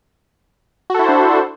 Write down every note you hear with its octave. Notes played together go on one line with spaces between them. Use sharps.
D4 E4 F#4 A4 C5